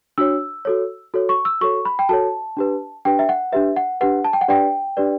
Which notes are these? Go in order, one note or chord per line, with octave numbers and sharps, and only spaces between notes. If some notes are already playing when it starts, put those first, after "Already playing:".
D4 F#4 C#5 E6
F#4 A4 C#5
F#4 A4 C#5
C#6
E6
F#4 A4 C#5 C#6
B5
G5
F#4 A4 C#5 A5
D4 G4 B4
D4 G4 B4 G5
E5
F#5
D4 G4 B4 E5
F#5
D4 G4 B4 F#5
A5
G5
F#5
D4 G4 B4 D5 G5
D4 G4 B4 D5